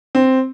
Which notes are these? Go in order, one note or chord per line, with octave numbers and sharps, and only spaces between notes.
C4